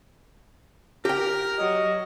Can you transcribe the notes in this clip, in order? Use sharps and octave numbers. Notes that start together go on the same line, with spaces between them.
G4 A#4 G5
F#3 D#5